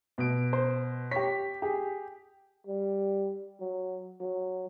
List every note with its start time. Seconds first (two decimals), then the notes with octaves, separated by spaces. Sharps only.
0.18 B2 D7
0.53 C5
1.11 G4 C#5 B6
1.62 G4 G#4
2.67 G3
3.60 F#3
4.21 F#3